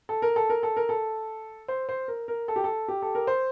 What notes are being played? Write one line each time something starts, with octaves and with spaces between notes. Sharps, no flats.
A4
A#4
A4
A#4
A4
A#4
A4
C5
C5
A#4
A#4
A4
G4
A4
G4
A4
A#4
C5